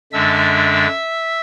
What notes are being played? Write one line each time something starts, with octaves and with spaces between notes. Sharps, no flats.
F#2 D3 G#3 D4 E5 E6